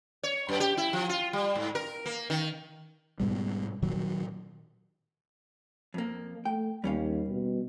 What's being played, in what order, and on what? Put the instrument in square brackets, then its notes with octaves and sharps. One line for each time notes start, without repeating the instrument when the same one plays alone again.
[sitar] C#5
F#2
G4
E4
F3
F4
G3
G#2
A#4
A#3
D#3
[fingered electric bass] G#2 B2 G3
A#2 D#3 F#3
[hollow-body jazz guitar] F2 A#3
[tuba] A3 [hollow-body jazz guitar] G5
[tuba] D#2 [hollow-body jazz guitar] G3 C#4 F5
[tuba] B2